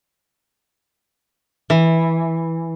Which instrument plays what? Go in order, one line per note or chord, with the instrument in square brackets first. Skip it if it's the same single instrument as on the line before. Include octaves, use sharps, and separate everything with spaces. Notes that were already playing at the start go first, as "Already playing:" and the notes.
[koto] E3